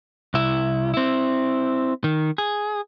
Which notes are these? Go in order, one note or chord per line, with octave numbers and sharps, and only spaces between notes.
C2 E4
C4 E4
D#3
G#4